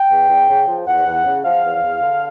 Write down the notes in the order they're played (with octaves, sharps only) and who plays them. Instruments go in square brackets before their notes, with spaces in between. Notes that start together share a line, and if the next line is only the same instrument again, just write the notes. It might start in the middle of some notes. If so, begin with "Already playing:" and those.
Already playing: [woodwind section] G5
E2
E2
C#3
F3
E2 F#5
E2
C#3
F3 F5
E2
E2
D3